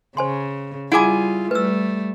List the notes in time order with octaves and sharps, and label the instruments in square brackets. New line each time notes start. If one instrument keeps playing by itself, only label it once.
[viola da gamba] C#3 [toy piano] C5 G#5 C6
[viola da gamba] G3 F4 [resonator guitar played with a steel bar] E4 G#4 G#5 [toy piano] F#5 D6
[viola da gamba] G3 A3 [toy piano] B4 E6